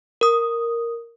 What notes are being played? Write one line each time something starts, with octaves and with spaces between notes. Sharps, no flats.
A#4 D#6